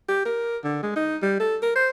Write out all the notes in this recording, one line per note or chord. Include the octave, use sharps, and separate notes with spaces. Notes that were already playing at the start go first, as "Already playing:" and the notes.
G4
A#4
D3
G#3
D#4
G3
A4
A#4
C5